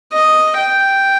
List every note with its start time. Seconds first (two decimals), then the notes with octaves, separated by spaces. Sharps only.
0.12 D#5
0.58 G5